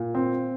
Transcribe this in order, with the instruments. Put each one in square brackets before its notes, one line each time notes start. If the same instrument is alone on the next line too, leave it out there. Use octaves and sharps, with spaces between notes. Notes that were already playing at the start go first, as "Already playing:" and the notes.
Already playing: [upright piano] A#2
C4